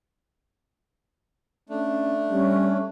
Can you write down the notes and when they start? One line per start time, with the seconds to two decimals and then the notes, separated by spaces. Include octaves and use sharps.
1.69 A3 C#4 D4
2.30 G3 C#4